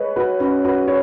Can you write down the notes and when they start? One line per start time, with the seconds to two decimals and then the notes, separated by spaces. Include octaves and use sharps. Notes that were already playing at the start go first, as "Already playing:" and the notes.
Already playing: G#4 B4 C#5 D#5
0.16 F#4 B4
0.40 C#4 F#4
0.64 F#4 B4
0.87 C#5